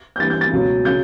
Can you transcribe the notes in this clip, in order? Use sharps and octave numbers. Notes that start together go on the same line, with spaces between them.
G6
G2 E3 A6
G6
A6
C#2 B2 F#3
C#3 F#3 G6